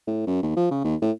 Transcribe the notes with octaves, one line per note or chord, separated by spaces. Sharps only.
A2
F#2
D#2
F3
C#3
D#2
A2